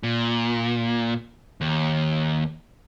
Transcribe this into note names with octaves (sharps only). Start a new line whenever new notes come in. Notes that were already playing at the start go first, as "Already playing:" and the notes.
A#2
D#2